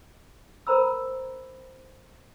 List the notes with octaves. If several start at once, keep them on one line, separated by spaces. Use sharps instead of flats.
A#4 C5 A#5 B5 E6